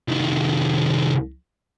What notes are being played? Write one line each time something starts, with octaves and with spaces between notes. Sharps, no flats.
C2 D#3